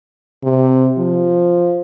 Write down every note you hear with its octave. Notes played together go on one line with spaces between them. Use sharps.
C3
F3